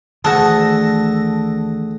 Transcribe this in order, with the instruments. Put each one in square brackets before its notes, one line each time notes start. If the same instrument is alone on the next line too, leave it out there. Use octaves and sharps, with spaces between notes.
[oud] D2 [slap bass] D#3 E3 [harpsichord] G#4 F#5 [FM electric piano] A5 E6 A#6